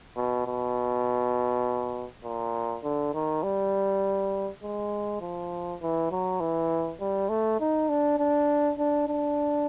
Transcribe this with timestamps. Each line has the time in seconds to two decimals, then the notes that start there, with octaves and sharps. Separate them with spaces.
0.17 B2
0.46 B2
2.24 A#2
2.83 D3
3.14 D#3
3.43 G3
4.63 G#3
5.21 F3
5.82 E3
6.11 F#3
6.40 E3
7.01 G3
7.29 A3
7.60 D#4
7.89 D4
8.19 D4
8.78 D4
9.08 D4